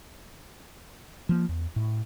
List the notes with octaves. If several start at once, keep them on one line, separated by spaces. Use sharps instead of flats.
F3 A#3
E2
A2